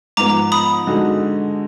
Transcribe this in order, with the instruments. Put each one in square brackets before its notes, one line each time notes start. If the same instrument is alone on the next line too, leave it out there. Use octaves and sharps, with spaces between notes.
[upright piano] G#2 F3 B3 [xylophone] A#5 D6
[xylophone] B5 D#6
[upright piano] D3 G#3 D#4 F#4